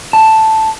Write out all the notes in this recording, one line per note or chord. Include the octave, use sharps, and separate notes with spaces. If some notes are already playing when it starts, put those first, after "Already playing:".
A5